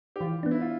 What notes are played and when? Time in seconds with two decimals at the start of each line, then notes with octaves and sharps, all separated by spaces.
0.16 G4
0.21 E3 F4
0.43 B3 D4
0.51 E4
0.61 F4